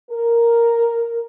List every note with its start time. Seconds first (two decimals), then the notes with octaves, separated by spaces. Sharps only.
0.10 A#4